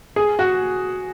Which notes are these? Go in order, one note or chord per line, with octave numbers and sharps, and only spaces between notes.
G#4
F#4